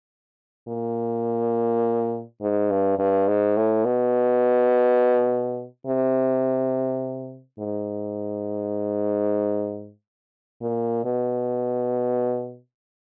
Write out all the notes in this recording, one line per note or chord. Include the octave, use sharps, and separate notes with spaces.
A#2
G#2
G2
G2
G#2
A2
B2
C3
G#2
A#2
B2